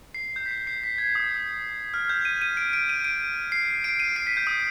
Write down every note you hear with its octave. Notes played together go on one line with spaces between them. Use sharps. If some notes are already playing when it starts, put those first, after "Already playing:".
C7
G6
B6
C7
C7
B6
G#6
D#6
F6
G6
D#7
D#7
D7
D7
D#7
D7
C7
D7
D#7
C7
B6
G6
D#6